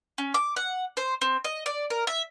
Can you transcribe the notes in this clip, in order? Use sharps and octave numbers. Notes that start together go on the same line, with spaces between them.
C#4
D6
F#5
C5
C4
D#5
D5
A#4
E5